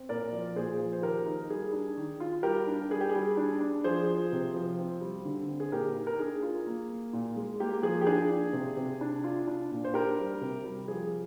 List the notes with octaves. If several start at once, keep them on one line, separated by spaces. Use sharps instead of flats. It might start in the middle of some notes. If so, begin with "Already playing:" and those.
Already playing: C4
A#2 A#4 D5
F3
A#2 G#4 C5
F3
C5
D#3 G4 A#4
D#4
G3 G#4
D4
D#3
F4
G3 G4 A#4
D4
G3 G#4
G4
G#4
G3
D4
D4
F3 G#4 C5
F4
C3
F3
C4
G3
D3
C4
G#4
A#2 G4 A#4
D#4
A#4
D4 G#4
F4
A#3
A#3
A#2
G#3
A#3 G4
F3 G#4
G4
D4 G#4
D4
C3
C3
D4
F4
D4
A#2
C5
D4 G4 A#4
G3
C3
G3
F3 G#4